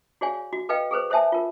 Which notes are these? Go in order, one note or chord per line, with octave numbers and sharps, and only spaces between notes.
F#4 G#4 C#5 D5 F5 G#5
F#4
A4 B4 D#5 F5 G5
G#4 A4 B4 C5
A4 C5 C#5 E5 G#5 A5
F4 A#4